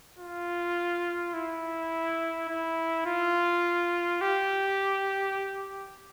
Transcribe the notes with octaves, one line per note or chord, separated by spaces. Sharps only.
F4
E4
E4
F4
G4